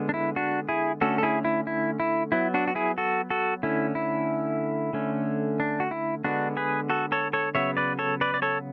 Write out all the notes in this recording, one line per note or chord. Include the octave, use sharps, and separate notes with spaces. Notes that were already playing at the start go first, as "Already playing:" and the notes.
Already playing: D3 G#3 B3
D4
E4
D4 F#4
E4 G#4
D3 A3 C#4 F#4 A4
A4
E4 G#4
E4
E4
E4
F#3 B3 E4
D4 F#4
F#4
E4 G#4
F#4 A4
F#4 A4
D3 A3 C#4 E4
E4
D3 A3 C#4
D4
F#4
E4
D3 G#3 B3 D4 F#4
G#4 B4
F#4 A4
A4 C#5
A4 C#5
C#3 F#3 B3 C#5 E5
B4 D5
A4 C#5
B4 D5
D5
A4 C#5